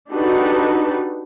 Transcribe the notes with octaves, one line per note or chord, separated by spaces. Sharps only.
D4 D#4 F#4 G4 A4 B4